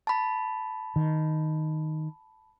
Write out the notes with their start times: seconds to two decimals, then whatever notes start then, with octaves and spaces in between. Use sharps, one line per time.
0.07 A5 B5
0.96 D#3